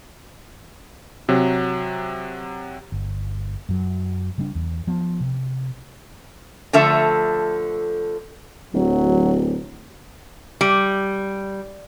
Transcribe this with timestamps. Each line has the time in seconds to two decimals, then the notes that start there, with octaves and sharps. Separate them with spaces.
1.29 C3 F#3
2.92 G1
3.69 F#2 F#3
4.38 C#3 G3 G#3 D4
4.55 E2
4.87 F3 B3
5.20 C3
6.73 D3 F3 A3 A4 E5
8.74 D1 F#3
10.61 G3